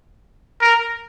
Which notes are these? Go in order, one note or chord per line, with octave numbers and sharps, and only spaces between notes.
A#4